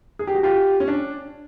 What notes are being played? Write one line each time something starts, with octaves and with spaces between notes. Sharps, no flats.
G#4
G4
F#4
F4 G4
C#4
D4